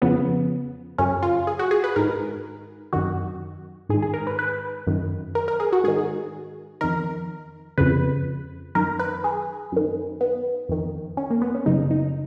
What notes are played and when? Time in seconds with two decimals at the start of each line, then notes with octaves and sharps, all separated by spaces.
0.02 F2 C#3 B3
0.98 F#2 C#3 C#4
1.23 F4
1.47 G#4
1.59 F#4
1.71 G#4
1.84 B4
1.96 G#2 D#3 A#4
2.93 F#2 D#3 F#4
3.89 G#2 G#4
3.94 D#3
4.02 G#4
4.14 A#4
4.27 B4
4.39 B4
4.87 F#2 D#3
5.35 A#4
5.48 A#4
5.60 G#4
5.73 F#4
5.84 G#2 D#3 G#4
6.81 F2 D#3 A#4
7.78 F2 C#3 B4
8.75 F#2 D#3 A#4
9.00 B4
9.24 G#4
9.72 F#2 D#3
10.21 B3
10.69 F2 D#3
11.17 C#4
11.31 A#3
11.42 B3
11.55 C#4
11.66 F#2 C#3 D#4
11.91 D#4